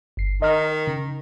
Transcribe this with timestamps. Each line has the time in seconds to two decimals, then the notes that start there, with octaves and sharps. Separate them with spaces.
0.17 G1 C7
0.42 D#3 D#5 F6
0.87 C#3